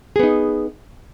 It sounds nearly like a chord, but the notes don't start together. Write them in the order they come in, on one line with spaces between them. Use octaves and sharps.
G#4 B3 D#4